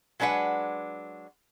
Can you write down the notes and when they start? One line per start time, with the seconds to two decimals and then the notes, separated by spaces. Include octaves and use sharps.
0.20 F#3 G#3 D4 B4 F#5